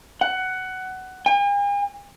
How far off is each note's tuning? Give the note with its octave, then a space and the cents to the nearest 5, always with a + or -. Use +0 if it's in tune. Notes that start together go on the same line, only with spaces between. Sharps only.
F#5 +15
G#5 -45